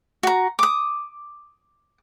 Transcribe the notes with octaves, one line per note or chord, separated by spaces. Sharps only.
F#4 A#5
D6 D#6